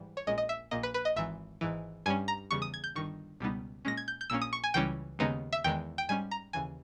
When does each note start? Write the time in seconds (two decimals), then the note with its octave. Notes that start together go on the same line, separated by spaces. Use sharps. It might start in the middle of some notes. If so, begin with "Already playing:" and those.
Already playing: G#2 E3 G3
0.17 C#5
0.27 A#1 A#2 G#3 C#4 D#5
0.38 D#5
0.49 E5
0.71 A#1 A#2 A#3 D#5
0.83 B4
0.94 B4
1.05 D#5
1.16 G#1 G#2 E3 E5
1.61 G#1 G#2 E3
2.06 G2 G3 C#4 G#5
2.28 A#5
2.51 E2 C#3 G3 C#6
2.62 D#6
2.74 G#6
2.84 G6
2.95 G1 G2 D#3 C#6
3.40 C#2 B2 G3 B3 D#4
3.85 A#2 G#3 C#4 A#6
3.97 G#6
4.08 G6
4.21 G6
4.30 A#1 A#2 A#3 C#4 E6
4.42 D#6
4.53 C#6
4.64 G#5
4.74 C#2 C#3 E3 G3 C#4 G5
5.19 D#2 C#3 G#3 B3 D#4
5.53 E5
5.64 E2 D#3 G#3 G5
5.98 G5
6.09 G#2 G3 C#4 G#5
6.31 A#5
6.53 D#2 C#3 E3 G#5